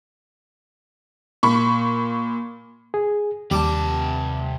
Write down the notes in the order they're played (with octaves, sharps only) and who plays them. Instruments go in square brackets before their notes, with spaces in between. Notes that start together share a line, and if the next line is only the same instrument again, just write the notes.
[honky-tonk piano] A#2 B5 C#6
[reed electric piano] G#4
[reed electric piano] D#2 [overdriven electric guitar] C3 A5 [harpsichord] G3 D6